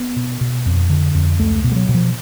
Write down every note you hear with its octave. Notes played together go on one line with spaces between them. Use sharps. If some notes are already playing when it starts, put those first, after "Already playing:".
Already playing: B3
B2
B2
F2
D3
F2
C#2 A3
B2
G#3
F#3
B2
F3